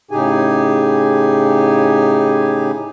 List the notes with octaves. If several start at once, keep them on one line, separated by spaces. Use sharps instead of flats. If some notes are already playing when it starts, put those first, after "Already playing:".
A2 C#3 D#4 G4 G#4 G#5